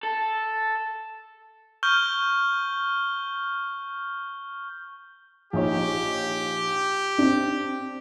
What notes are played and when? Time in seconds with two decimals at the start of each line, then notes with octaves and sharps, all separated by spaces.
0.03 A4
1.83 C#6 F6 G6 G7
5.53 A#1 D#4 G4 C#5
7.18 C4 D4